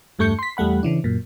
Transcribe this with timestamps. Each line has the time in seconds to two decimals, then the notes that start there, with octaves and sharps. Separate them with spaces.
0.19 E2 G2 A3 C#6 G6 C#7
0.39 C6 B6
0.57 E2 G3 A3 F#5 B5
0.83 C#3 E3 D4
1.04 F#2 A#2